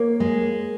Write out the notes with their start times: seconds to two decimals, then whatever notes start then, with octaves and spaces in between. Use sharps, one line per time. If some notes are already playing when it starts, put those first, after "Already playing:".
Already playing: A#3 C#5
0.20 G#3